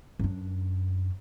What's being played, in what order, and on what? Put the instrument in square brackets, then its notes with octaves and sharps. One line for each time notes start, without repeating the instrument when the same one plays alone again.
[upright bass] F#2 D4